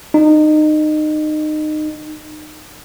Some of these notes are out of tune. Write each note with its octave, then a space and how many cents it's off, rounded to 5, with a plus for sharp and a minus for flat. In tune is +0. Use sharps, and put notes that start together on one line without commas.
D#4 -25